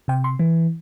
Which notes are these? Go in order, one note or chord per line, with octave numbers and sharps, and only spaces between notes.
C3 G5
C6
E3